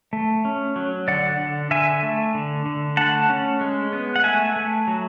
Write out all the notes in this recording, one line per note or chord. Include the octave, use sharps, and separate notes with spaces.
A3
C#4
F#3
D3 D5 F#5
D3
D3 E5 G#5
A3
D3
D3
A3 F#5 A5
C#4
G#3
B3
F#5
A3 E5 G#5
A3
F#3